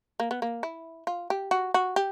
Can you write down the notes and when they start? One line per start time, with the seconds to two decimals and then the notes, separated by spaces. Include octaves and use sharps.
0.20 A#3
0.31 B3
0.42 A#3
0.63 E4
1.07 F4
1.30 G4
1.51 F#4
1.74 F#4
1.96 G4